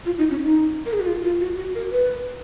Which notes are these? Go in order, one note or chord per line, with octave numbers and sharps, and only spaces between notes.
F4
D#4
C#4
D#4
A#4
G#4
F#4
F4
F4
F#4
F#4
A#4
B4